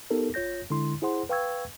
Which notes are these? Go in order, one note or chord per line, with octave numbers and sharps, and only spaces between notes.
B3 D#4 G4 A4 A#4
G1 F4 C#5 G6 A#6
D3 G#3 E4 C6
E4 G#4 C5 F#5 C6
B4 F5 G5 C#6 E6 G#6